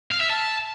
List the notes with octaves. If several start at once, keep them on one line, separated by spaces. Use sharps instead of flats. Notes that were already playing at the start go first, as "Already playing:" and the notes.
F5
E5
A5